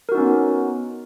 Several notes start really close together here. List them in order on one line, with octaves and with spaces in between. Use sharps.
A#4 F#4 D#4 C#4 B3